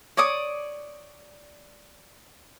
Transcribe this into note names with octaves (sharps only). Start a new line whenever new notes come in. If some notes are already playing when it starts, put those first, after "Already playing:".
C#5 D5 D6 D#6